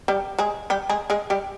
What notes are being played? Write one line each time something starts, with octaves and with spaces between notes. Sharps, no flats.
G3 G4
G#3 G#4
G3 G4
G#3 G#4
G#3 G#4
G3 G4